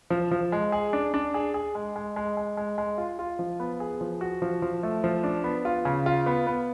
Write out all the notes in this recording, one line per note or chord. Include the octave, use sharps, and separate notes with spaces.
F3
F3
G#3
G#4
D4
D4
G#4
G#4
G#3
G#3
G#3
G#3
G#3
G#3
F4
F4
F3
B3
G#4
F3
F#4
F3
F3
A3
F3
D4
B3
F4
C#3
F4
B3
B3